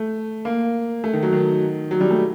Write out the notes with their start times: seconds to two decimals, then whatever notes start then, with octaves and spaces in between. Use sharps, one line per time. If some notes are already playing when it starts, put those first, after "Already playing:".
Already playing: A3
0.45 A#3
1.04 A3
1.13 D#3
1.23 F#3
1.33 D#3
1.91 F#3
2.01 G3
2.11 A3